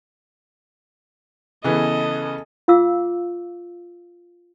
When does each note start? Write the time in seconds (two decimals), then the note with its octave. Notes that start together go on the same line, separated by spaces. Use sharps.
1.64 C#3 E3 B3 A4 D#5
2.68 F4 F5 D6 E6